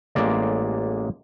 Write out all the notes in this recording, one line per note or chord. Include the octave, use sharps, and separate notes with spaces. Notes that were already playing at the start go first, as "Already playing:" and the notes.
A1 G#3 A#3 D5